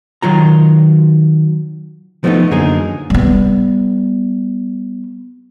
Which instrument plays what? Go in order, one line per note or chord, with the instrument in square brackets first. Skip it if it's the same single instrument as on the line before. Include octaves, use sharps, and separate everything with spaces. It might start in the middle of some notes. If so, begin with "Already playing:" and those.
[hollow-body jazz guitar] D#3 F#3 F4 A#5
F3 A3 B3 C#4 D#4
F#2 D3 A#3 D#4 G#4 A#4
[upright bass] G3 B3